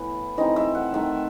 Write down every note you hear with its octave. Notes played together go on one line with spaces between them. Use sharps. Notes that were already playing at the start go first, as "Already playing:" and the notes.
Already playing: A2 E3 B3 B4
E3 A3 C4 D#4 D#5
E5
F#5
D#3 A3 D#4 E5